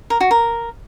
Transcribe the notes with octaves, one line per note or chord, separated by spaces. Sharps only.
A#4
F#4
A#4